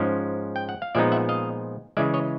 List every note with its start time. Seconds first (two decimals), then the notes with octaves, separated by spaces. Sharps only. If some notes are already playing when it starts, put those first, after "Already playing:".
Already playing: G#2 F3 G#3 C#4
0.56 G5
0.69 F#5
0.82 F5
0.95 A#2 F3 G#3 B3 D#4 D5 E5
1.12 E5 F#5
1.29 D#5 F5
1.97 C#3 E3 G#3 D5 E5
2.14 C#5 D#5